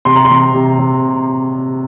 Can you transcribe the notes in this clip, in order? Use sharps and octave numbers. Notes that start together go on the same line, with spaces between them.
C3 C6
A#5
C6
C3
C3
C3